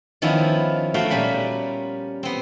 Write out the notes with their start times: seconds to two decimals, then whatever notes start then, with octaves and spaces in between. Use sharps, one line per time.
0.22 D#3 F3 B3 C#4 E4
0.94 A3 F#4 F5 G5
1.10 A#2 G3 C#4 B5
2.23 B3 C4